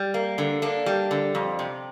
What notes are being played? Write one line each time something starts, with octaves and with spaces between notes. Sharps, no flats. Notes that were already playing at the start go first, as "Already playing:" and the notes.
Already playing: G3
A#3
D3
A#3 D4
G3
D3
F2
C3